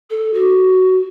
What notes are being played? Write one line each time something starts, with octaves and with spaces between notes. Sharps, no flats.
A4
F#4